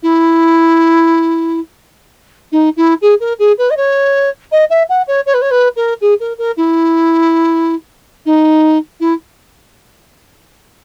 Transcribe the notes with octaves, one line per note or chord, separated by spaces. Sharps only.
E4
D#4
E4
G#4
A#4
G#4
B4
D#5
C#5
D#5
E5
F#5
C#5
C#5
B4
C#5
B4
A#4
G#4
A#4
A#4
E4
D#4
E4